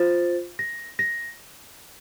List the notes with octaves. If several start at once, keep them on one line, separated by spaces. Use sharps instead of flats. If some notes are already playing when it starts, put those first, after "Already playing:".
Already playing: F4 C5 A6
A#6
A#6